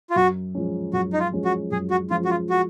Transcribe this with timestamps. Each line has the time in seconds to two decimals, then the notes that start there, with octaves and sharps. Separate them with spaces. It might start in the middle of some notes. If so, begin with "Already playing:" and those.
0.10 F4
0.16 F#2 F#4
0.55 F3 G#3 C#4
0.93 F#2 F#4
1.13 D#4
1.20 F4
1.33 F3 G#3 C#4
1.45 F#4
1.71 F#2 G#4
1.90 F#4
2.10 F3 G#3 C#4 F4
2.25 F#4
2.30 F4
2.50 F#4